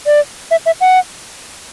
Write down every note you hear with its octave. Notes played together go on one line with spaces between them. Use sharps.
D5
E5
E5
F#5